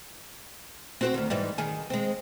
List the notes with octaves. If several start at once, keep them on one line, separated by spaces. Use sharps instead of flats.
C4 F#4 C5
D2 D#3
G#2 E3 G3
D#3 G#4
G#3 C4